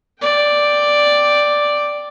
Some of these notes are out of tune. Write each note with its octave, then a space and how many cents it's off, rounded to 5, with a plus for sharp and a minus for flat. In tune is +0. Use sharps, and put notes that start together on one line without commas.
D5 +0 G5 +0